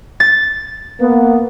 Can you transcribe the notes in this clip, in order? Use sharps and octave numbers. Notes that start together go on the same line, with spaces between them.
A6
A#3 B3